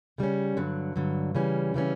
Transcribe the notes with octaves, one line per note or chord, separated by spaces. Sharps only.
C#3 G3 C#4
G2 D3 F#3
G2 D3 F#3
C#3 E3 G3 C#4
C#3 E3 G3 C#4